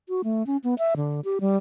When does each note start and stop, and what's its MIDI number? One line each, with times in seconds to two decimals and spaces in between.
0.09 0.22 66
0.24 0.45 57
0.47 0.57 61
0.64 0.75 59
0.78 0.94 76
0.96 1.21 50
1.25 1.39 67
1.41 1.57 55